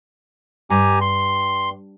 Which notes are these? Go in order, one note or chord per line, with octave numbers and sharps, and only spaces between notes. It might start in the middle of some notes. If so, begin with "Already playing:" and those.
G2 G4 G#5 A#5
C6